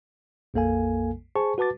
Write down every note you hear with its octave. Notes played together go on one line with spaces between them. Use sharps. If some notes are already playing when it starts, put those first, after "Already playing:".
A#1 F2 A#3 A4 F5 G#5
G#4 C5 G#5 A5 C#6
F#4 B4 A5 D6 A6